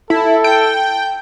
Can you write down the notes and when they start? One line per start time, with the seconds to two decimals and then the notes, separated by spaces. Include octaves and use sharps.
0.10 E4 A4
0.44 G5